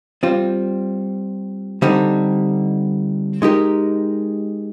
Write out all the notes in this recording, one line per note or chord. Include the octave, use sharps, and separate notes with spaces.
G3 C4 F4
D3 G3 C4 D#4
G#3 D#4 G4 A#4